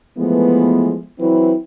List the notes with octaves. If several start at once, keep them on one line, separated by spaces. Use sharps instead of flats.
E3 F3 G#3 A3 B3
E3 F#3 C4 E4 B4 C5